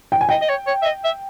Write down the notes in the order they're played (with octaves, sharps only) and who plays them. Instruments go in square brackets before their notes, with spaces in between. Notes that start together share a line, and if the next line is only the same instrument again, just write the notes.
[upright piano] G5
G#5
[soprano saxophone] D#5 [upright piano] G5
[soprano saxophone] D#5
C#5
C#5
E5
D#5
E5